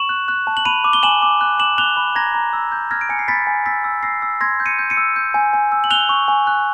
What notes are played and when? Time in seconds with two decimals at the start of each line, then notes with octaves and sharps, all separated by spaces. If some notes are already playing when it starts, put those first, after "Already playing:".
Already playing: C#6 E7 F#7
0.09 F#6
0.28 F#6
0.47 A5
0.57 F#7
0.65 B5 D#7 F7
0.84 D6
0.93 G7
1.03 G#5 E7 F#7
1.22 D6
1.41 F#6
1.59 D6 E7 F#7
1.78 F#6 F7 G7
1.97 B5
2.15 A#5 G#6 A#6
2.34 A#5
2.53 E6
2.72 G6
2.91 F6 G#6 A#6
3.01 D7
3.09 G#5 C#7
3.19 C7
3.28 B5 A6 B6
3.47 G#5
3.66 E6 A6 B6
3.84 E6
4.03 E6 A#6 C7
4.22 E6
4.41 C6 G#6 A#6
4.60 G6
4.66 C#7 D#7
4.79 G6
4.90 C#7 D#7
4.97 E6
5.16 G6
5.34 G#5
5.53 G#5
5.72 E6
5.84 F#7
5.90 F#6 F7 G7
6.09 C#6
6.28 G#5
6.47 F#6